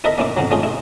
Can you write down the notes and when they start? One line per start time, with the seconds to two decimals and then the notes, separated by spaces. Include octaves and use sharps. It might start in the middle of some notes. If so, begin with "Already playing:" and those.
0.04 E4 A4 A#4 D#5 A#5 B5
0.18 A#3 C#4 E4 D6
0.37 F2 C#3 F#3
0.51 A3 C#4 F4 G#4
0.63 E4